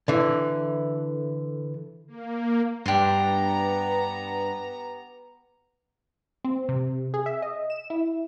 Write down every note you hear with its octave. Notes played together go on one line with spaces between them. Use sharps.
D3 E3
A#3
G2 B3 D4 G4 A#5 C6
C4
C3
G#4
E5
D#5
E7
E4